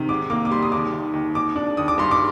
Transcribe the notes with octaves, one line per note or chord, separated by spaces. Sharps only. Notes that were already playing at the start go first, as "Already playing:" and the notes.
Already playing: C3 D#3
G#2 D6
A#3 D6
D6
G3 C6
D#6
D#2 D6
D#3
D#2
D#2 D6
D4
D#2 D#6
D6
G2 C6
D6